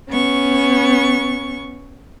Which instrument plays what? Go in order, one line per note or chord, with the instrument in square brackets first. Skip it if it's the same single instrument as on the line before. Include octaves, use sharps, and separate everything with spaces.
[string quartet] B3 C#4 C#6